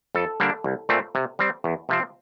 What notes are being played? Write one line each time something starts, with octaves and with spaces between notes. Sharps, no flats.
F2 A4
D3 G3 A#3 D4
C2
A#2 A3 C4
C3
G3 C4
E2
C3 F3 C4